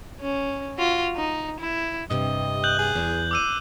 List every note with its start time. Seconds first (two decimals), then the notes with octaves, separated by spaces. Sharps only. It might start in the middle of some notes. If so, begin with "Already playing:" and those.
0.21 C#4
0.78 F4 F#4
1.16 D#4
1.60 E4
2.10 G2 C3 D#5
2.64 F#6 G6 F#7
2.79 G#4
2.95 E2
3.31 D6 E6 D#7